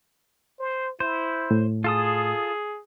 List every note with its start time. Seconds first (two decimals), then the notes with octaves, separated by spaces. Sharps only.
0.59 C5
1.00 E4 C5
1.51 A2
1.84 F4 G#4 A4 D#6